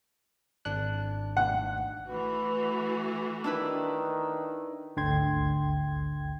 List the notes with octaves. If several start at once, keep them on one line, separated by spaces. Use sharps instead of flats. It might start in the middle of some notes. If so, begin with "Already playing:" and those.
G#1 D4 F#6
F#5
E3 A3 F#4 B4
D#3 D4 E4 B4
G#1 D2 D3 G5 C6 G#6